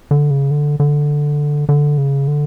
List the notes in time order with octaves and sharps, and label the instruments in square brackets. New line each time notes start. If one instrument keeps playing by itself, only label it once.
[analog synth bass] D3
C#3
D3
D3
D3
C#3
D3